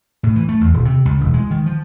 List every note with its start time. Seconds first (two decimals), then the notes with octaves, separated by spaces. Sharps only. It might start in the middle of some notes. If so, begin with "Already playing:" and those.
0.23 A2
0.36 E3
0.49 A3
0.61 E2
0.74 D#1
0.85 C3
1.05 C#2
1.20 E1
1.34 G#3
1.51 D#3
1.66 F3